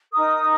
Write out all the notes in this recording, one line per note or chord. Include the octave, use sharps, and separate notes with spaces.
D#4 A#4 D#6